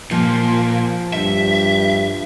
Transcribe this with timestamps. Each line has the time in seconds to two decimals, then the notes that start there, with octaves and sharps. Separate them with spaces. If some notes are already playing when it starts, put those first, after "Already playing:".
0.11 A#2 F3
1.13 G2 E5